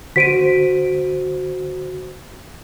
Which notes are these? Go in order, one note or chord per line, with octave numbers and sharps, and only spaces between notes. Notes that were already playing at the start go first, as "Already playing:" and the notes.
D3 F#4 C5 B6 D7 D#7